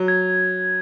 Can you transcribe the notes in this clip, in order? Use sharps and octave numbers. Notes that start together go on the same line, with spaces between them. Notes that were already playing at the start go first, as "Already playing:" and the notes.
Already playing: F#3
G#6